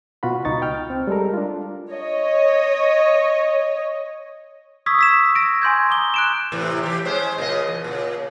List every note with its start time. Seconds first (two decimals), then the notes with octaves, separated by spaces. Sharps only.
0.23 B2 F4 F#4 B5
0.45 C#2 D#4 C#6 A6
0.62 G5 F6
0.90 C4
1.07 G3 G#3 A4 A#4
1.34 D4 F4
1.91 C#5 D#5
4.86 C#6 D#6 E6 G#6 B6
4.99 E6 B6 E7
5.35 A#6 D7
5.62 G#5 C6 G6 G#6
5.90 A#5 D6 D#6 G7
6.14 F#6 D7 E7
6.52 A2 C3 E3
6.83 E3 G4
7.05 G#3 C#4 C5
7.38 A#2 C#3 D#5
7.67 E2
7.84 A#2 C#3